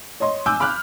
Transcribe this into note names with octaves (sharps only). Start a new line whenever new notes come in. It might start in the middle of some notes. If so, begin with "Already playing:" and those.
C#5 D#5 C6
G#5 D6 E6 F#6 G6
B5 D6 F6 F#6